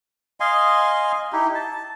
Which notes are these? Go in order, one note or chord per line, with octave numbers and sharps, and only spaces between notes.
D#5 F5 G#5 C6
D#4 E4 G4
A5